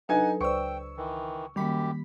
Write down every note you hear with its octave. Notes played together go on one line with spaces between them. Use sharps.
F#3 D4 D#4 A4 B4 F#5 G#5 G#6
C#2 B4 C5 D5 G5 C#6 E6
D#3 E3
F#2 D#3 G3 A#3 G4 B5 B6